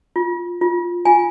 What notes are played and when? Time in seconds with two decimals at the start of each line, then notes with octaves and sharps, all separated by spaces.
0.16 F4
0.61 F4
1.05 F4 G#5